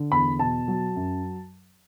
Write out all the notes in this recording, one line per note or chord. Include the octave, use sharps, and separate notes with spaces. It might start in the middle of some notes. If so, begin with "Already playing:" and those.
Already playing: D3
E2 B5
B2 A5
F#3
F#2